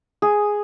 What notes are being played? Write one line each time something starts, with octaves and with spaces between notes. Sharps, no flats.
G#4